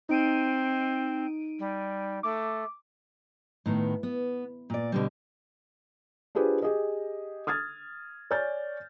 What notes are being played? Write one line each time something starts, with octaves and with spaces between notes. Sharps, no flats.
C4 D#4 D7 D#7
G3
A3 D6
A2 D#3 B3
B3
A#2 D5
B2 D3 G3
D4 F4 G4 G#4 B4 C5
G4 G#4 D#5
D#6 F6 G#6 A6
C#5 D5 G#5 F6 G6 A6